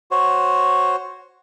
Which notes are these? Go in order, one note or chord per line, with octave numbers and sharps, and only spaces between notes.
F#4 C5 C#5